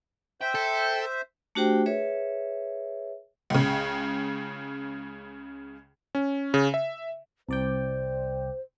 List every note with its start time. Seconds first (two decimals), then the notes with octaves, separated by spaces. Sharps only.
0.41 C5 E5 G5
0.55 A4
1.55 A3 D4 F#4 G4 C5 G5
1.86 G#4 B4 C#5 E5
3.50 C#2 C#3
6.15 C#4
6.54 C#3
6.74 E5
7.49 C2 C5 D5 G5